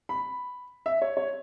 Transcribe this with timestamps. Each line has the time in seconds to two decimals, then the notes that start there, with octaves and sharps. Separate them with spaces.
0.09 B5
0.86 E5
1.02 C#5
1.17 C#5